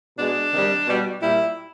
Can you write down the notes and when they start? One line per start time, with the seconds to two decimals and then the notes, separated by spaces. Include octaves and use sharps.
0.18 B2 G#3 D4
0.52 C3 D#3 G3
0.87 B2 G3
1.21 A#2 G3 E4